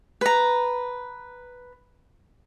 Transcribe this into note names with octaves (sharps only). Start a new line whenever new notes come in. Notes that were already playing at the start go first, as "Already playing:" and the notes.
B4 A#5